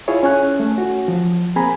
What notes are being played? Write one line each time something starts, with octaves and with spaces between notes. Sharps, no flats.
E4 F4 G#4 C#5
C#4 C#5 G#5 F#6
A3
F#4
F3
A#3 C4 G#4 G#5 A#5 B5